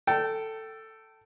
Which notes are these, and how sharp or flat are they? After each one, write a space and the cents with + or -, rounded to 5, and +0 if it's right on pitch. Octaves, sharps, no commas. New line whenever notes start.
A4 +10 G5 -20